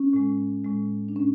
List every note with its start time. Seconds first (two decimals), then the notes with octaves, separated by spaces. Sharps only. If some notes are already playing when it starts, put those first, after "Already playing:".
Already playing: C#4
0.13 A2 G#3
0.65 A2 G#3
1.09 D4
1.16 A2 C#4